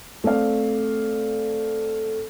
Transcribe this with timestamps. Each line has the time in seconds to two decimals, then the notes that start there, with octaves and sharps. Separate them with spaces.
0.24 A3 C4 D5 F5